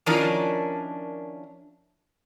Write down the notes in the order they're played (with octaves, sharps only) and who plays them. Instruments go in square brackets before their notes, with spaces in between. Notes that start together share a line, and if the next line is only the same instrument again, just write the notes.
[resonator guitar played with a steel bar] D#3 F3 C#4 D4 E4 A#4